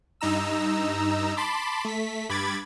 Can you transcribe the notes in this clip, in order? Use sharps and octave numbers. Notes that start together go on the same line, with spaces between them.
G2 D#4 A#5 E6
A5 B5 C6 D6
A3 B6
G2 B5 D6 G#6 A6